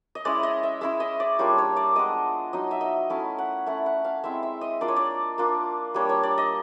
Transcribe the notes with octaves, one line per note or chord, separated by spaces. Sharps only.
D#5
G#3 C#4 E4 D5
D#5
E5
G#3 C#4 E4 E5
D#5
D5
G3 A#3 D4 F4 C#5
C#5
D5
G#3 B3 D4 D#5
F#3 B3 D#4 D#5
E5
D#5
A3 C#4 E4 F5
F#5
A3 C#4 E4 F#5
F#5
F5
G#3 C4 E4 E5
E5
D#5
A#3 D4 F4 D5
C#5
D5
A#3 D4 F4
G3 A#3 D4 C#5
C#5
D5
D#5